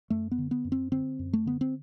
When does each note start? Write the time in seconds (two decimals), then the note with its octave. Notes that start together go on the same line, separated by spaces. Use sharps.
0.10 F#2 A3
0.31 B3
0.38 D3
0.51 B3
0.65 F#2
0.72 C4
0.92 D3 C4
1.19 F#2
1.33 A3
1.46 D3 B3
1.61 C4